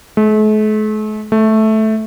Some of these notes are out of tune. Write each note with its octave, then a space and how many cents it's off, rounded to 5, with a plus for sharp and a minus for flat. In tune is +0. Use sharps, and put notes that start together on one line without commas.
A3 -45
A3 -10